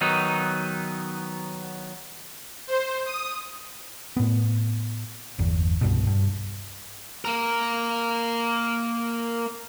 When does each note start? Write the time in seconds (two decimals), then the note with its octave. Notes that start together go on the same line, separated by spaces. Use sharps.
0.01 D#3 F#3 B3 D#4
2.67 C5
3.06 D#6
4.17 A2 B3
5.39 G1 E2
5.81 C2 G2 B2
6.07 G2
7.25 A#3 A#4